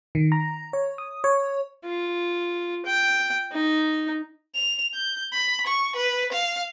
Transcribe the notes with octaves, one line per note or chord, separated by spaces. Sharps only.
D#3
A#5
C#5
D#6
C#5
F4
G5
D#4
F7
G6
B5
C#6
B4
F5